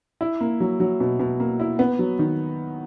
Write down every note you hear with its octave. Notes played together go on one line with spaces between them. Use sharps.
E4
A#3
F#3
F#3
B2
B2
A#3
E4
B3
F#3
D#3